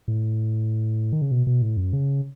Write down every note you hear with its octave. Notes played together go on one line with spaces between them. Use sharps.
A2
D#3
C#3
B2
B2
A2
F#2
C#3